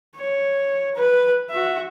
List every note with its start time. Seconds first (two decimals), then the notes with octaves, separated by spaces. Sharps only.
0.17 C#5
0.95 B4
1.50 F#4 E5